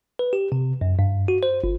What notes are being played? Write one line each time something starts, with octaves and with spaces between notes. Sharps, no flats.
B4
G4
C3
F#2
G2
F#4
C5
G1